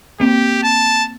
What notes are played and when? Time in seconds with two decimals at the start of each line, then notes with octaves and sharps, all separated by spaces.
0.20 A#3 C4 G4
0.63 A5